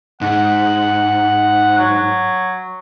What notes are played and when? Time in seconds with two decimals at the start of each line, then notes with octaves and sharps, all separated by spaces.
0.21 G#2 F#5
1.78 F#3